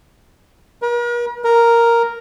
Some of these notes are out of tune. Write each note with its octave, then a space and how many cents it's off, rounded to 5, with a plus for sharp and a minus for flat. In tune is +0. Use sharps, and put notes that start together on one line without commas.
A#4 +45
A#4 +0